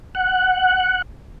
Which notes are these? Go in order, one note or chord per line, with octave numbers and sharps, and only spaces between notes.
F#5